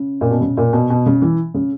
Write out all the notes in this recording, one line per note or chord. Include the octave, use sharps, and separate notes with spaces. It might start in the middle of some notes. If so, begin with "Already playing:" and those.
Already playing: C#3
A#2
B2
C#3
A#2
B2
B2
C#3
E3
C#3